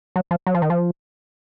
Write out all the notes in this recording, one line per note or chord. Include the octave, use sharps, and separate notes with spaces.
F#3
F3
F#3
F3
D#3
F3